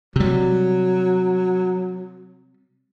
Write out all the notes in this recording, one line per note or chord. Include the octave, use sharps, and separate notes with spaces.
C3 F#3 G3